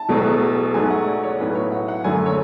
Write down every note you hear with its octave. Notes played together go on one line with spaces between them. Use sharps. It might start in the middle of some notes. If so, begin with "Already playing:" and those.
Already playing: A5
E1 E2 B2 F#3 A3
G#2 F#3 A3 G#5
F#5
D5
C#5
B1 A2 F#3 B4
C#5
F#5
F#5
F#1 F#2 D3 F#3 A3 G#5
C#5